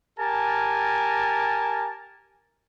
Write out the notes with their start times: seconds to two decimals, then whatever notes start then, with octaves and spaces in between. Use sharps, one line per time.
0.19 G4 A#4 G#5 A5